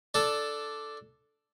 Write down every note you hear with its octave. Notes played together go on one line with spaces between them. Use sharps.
D4 A4